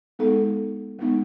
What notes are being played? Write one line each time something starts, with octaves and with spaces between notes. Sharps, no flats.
G#3 B3 D#4 A4
G#3 B3 D#4